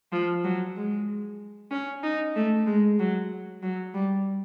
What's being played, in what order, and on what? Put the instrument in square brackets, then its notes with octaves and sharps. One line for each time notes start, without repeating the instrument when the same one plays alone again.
[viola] F3
F#3
G#3
C#4
D#4
A3
G#3
F#3
F#3
G3